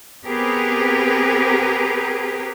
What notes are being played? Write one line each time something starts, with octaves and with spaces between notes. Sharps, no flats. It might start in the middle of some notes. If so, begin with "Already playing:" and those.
B3 C4 G4 G#4 A#4 B4